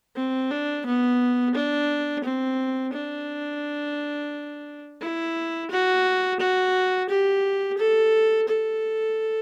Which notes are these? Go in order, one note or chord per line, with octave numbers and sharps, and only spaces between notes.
C4
D4
B3
D4
C4
D4
E4
F#4
F#4
G4
A4
A4